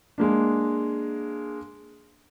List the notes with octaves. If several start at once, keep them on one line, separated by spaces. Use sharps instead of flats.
G#3 A#3 D4